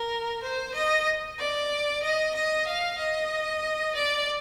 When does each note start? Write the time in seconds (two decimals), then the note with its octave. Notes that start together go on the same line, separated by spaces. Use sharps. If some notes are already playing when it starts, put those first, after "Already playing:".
Already playing: A#4
0.42 C5
0.74 D#5
1.39 D5
2.02 D#5
2.34 D#5
2.67 F5
2.98 D#5
3.95 D5